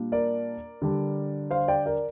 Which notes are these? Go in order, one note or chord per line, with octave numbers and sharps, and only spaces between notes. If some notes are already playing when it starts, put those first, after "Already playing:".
Already playing: A#2 G3 A#3 D4
A#4 D5
D3 G3 D4
C5 F5
D5 G5
A#4 D5